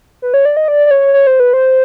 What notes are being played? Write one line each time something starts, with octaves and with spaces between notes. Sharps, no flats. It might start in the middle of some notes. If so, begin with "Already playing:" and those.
B4
C#5
D5
D#5
D5
D5
C#5
C#5
C5
B4
C5